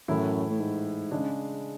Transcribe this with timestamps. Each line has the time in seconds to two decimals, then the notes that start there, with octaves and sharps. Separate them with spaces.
0.08 F#2 A2 E3 A3 E4
0.50 A2
0.60 G#2
1.11 C#3 G#3 D4